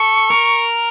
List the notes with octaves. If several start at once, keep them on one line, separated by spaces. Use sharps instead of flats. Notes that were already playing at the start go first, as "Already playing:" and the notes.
Already playing: A4 C#6
A#4